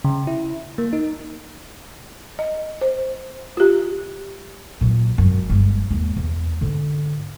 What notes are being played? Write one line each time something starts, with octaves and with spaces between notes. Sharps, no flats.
C#3
E4
A#3
D#4
D#5
C5
F4 G4
A#2 F#3
G#1 F#2
G1 G#3
D#2 G#3
E2
G#2 D3